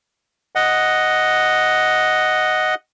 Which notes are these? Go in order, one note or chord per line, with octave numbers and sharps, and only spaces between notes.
D#5 F#5